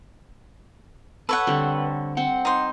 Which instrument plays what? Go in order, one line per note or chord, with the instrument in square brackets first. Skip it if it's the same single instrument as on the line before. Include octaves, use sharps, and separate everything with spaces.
[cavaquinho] A4 C#5 F#5 [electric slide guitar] B4
[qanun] D3 G3 C4
[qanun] C4 [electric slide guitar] F#5
[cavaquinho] D#4 C5